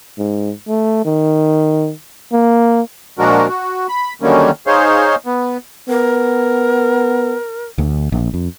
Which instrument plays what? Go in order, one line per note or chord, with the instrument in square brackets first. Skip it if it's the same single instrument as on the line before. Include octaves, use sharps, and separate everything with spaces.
[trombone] G#2
A3
D#3
A#3
[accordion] A#2 F3 G#3 D4 F#4 A#4
F#4
B5
D3 D#3 F#3 G3 A#3 C#4
D#4 G#4 C5 C#5 F5 C6
B3
[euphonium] B3 [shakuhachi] A#4
[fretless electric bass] D2
A#1
F2